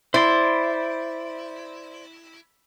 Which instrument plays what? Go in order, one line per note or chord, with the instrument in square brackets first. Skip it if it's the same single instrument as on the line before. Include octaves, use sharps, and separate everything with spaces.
[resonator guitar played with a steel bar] E4 [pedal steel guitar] C5 D5 C6